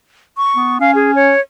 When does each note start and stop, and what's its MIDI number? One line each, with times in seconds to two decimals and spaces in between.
0.37 0.78 85
0.56 0.76 59
0.80 1.33 61
0.80 0.91 77
0.95 1.14 68
1.15 1.40 73